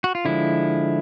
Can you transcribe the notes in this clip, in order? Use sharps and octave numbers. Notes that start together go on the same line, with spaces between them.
F#4
F4
D3 F3 G#3 E4